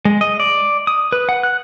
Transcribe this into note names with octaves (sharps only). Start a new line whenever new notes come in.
G#3
D#5
D5
D#6
B4
F#5
F#6